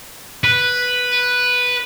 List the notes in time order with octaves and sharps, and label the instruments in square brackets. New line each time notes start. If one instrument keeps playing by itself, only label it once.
[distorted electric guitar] B4